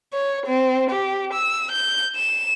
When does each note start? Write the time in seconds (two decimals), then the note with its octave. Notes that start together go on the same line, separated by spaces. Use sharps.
0.13 C#5
0.46 C4
0.90 G4
1.33 E6
1.71 G6
2.16 E7